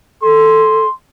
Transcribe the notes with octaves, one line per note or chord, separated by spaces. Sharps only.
A4 C6